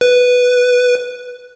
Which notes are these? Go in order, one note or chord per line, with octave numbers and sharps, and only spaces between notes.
B4